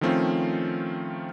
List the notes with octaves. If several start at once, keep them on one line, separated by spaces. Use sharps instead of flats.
D#3 F3 A3 C4 C#4 F4